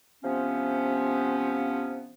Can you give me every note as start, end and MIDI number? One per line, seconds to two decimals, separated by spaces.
0.23 2.14 48
0.23 2.14 53
0.23 2.14 59
0.23 2.14 61